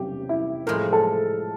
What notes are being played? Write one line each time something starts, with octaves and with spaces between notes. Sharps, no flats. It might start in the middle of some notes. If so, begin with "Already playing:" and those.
Already playing: E2 C3 C#4 G4
E4
A2 F3 G#3 A#4
A4